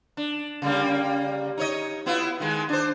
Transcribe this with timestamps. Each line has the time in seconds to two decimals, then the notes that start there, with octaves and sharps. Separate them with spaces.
0.17 D4
0.62 C#3 G3 A#3
1.58 D#4 C#5 D#5
2.06 B3 E4 F4
2.40 D#3 G#3
2.69 D4 C5